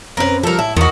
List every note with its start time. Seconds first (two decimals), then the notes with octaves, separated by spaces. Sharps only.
0.17 F#2 C4 C#4 A#4 B4
0.43 F3 G3 A4 A#4
0.59 A2 E4 A5
0.77 E2 D#3 F#4